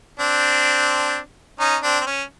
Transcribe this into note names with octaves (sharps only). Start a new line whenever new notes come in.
C4 D4
C#4 D#4
C4 D4
C4
C#4